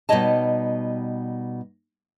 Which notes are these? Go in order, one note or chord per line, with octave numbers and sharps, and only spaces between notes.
B2 G3 D#4 C#5 D#5 A5